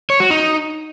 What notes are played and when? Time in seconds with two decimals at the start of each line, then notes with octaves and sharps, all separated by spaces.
0.10 C#5
0.20 F#4
0.30 D#4